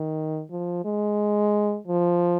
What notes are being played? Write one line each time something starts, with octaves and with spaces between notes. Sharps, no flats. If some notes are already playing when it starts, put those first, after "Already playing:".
Already playing: D#3
F3
G#3
F3